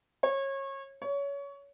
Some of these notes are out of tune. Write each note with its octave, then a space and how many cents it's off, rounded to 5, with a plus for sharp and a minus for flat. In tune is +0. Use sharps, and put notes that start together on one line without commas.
C#5 -25
C#5 +25